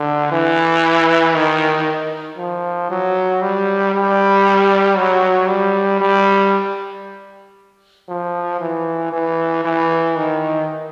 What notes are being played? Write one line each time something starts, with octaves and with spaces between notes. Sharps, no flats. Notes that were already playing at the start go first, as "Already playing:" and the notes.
Already playing: D3
E3
D#3
F3
F#3
G3
G3
F#3
G3
G3
F3
E3
E3
E3
D#3